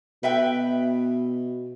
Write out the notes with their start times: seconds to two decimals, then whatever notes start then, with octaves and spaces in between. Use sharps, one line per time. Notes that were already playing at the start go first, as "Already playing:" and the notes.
0.23 B2 B4 E5 G5